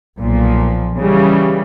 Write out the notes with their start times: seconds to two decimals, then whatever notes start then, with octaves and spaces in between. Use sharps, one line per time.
0.20 B1 A#2 F3
0.98 C#3 E3 G3